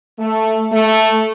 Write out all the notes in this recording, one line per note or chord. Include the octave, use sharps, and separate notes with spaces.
A3
A3